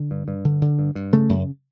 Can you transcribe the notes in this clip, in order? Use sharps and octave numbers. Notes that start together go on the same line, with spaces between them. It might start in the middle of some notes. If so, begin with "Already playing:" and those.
Already playing: D3
G2
G2
D3
D3
G2
G2
C#3 A3
F#2